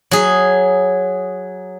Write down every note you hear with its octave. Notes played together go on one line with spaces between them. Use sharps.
F#3 G#4